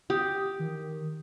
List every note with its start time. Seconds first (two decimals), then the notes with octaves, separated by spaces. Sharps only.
0.10 G4 D#6
0.59 D#3